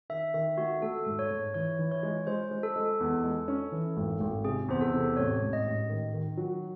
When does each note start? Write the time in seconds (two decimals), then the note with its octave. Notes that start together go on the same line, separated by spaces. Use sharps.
0.10 D#3 E5
0.34 D#3 E5
0.58 A3 F#4
0.82 A3 A4
1.06 G#2
1.19 C#5
1.31 G#2
1.54 E3 C#5
1.79 E3
1.92 C#5
2.03 G#3
2.27 G#3 C5
2.51 G#3
2.63 A4
2.76 G#3
3.00 E2
3.24 G#3
3.48 C#4
3.72 E3
3.97 G#1
4.20 G#1
4.45 C3 G#4
4.68 E2 C5
4.81 A4
4.93 C3
5.17 A1 C#5
5.41 G#2
5.53 D#5
5.66 A1
5.90 D#3
6.14 D#3
6.37 F#3